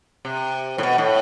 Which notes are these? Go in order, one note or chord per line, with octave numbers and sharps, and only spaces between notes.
C3
A2
B2
A2